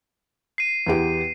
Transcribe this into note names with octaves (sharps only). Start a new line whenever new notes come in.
C7 D#7
E2 B3 G4